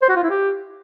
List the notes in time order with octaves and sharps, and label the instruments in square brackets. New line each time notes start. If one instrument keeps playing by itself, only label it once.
[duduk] C5
F#4
F4
E4
G4